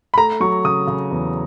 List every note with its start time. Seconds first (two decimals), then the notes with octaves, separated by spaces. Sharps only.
0.14 B5
0.17 A3 A#5
0.40 F#3 C#6
0.64 C#3 D#6
0.87 C#3
1.11 E2